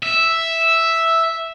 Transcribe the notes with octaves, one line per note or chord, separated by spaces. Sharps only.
E5